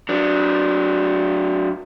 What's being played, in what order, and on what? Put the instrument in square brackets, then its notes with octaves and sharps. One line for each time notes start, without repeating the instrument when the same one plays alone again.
[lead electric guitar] F#3 D4